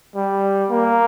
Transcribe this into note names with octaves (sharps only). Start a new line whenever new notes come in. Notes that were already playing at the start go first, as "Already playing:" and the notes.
G3
A#3